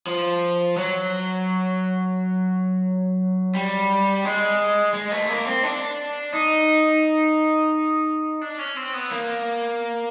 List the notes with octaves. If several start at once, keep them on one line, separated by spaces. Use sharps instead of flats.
F3
F#3
G3
G#3
G#3
A3
A#3
C4
D4
D#4
D4
C#4
C4
B3
A#3